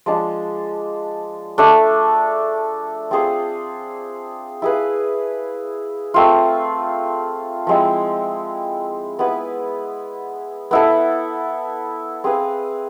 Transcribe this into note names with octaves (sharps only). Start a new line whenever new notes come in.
F3 G#3 D4
A3 D4 A4
C4 F4 G#4 C5
E4 G#4 B4 F5
A3 C4 F4
F3 G#3 C4 E4
B3 E4 G#4 B4
B3 E4 A4
C4 G#4 B4 F5